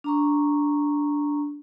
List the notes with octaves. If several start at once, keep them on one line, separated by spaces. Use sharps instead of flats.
D4 A#5 C#6